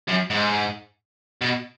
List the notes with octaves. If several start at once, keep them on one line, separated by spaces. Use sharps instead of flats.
F#2
G#2
B2